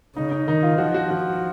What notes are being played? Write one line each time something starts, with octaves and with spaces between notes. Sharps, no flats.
C#3 D#4
D#4
D#3 D#4
F4
F3 F#4
F#4
F#4